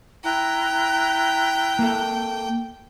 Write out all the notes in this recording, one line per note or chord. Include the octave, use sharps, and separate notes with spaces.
E4 G5 A#5 F#6
A#3 A4